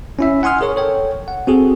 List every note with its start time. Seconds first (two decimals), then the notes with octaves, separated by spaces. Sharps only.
0.19 C#4 E4 E5
0.43 F#5 G#5 C6 D#6 F6
0.61 G#4 A#4 C#5 C#6
0.76 A4 C#5 G5
1.28 F#5
1.47 C4 F#4 G#4 A4